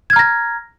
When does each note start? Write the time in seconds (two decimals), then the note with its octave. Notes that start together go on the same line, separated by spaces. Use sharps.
0.10 G#6
0.13 F6
0.16 A#5
0.19 A#6